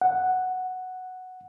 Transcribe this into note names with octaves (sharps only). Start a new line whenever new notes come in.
F#5